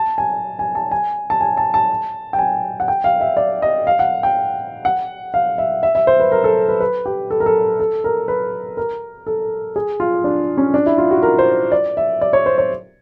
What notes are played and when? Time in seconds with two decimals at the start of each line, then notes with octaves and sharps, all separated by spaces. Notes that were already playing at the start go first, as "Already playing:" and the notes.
Already playing: A5
0.18 G#5
0.59 G#5
0.75 A5
0.92 G#5
1.30 A5
1.41 G#5
1.57 A5
1.74 A5
2.33 G5
2.39 G#5
2.80 F#5
2.88 G5
3.04 F5
3.21 E5
3.37 D5
3.62 D#5
3.87 F5
3.99 F#5
4.23 G5
4.85 F#5
5.34 F5
5.58 E5
5.83 E5
5.95 E5
6.07 C5
6.20 B4
6.32 A#4
6.44 A4
6.69 B4
6.80 B4
7.06 G4
7.30 A4
7.40 A#4
7.46 A4
7.80 A4
8.04 A#4
8.28 B4
8.77 A#4
9.27 A4
9.76 G#4
10.00 F4
10.24 D4
10.57 C#4
10.74 D4
10.86 E4
10.98 F4
11.11 F#4
11.23 A#4
11.39 C5
11.72 D5
11.97 E5
12.21 D5
12.33 C#5
12.46 C5
12.58 C#5